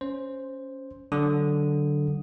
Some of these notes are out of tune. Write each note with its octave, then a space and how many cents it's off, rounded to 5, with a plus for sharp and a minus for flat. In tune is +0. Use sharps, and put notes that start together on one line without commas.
C#4 +0 C5 +0
D3 +0 F#3 +20 D#6 +0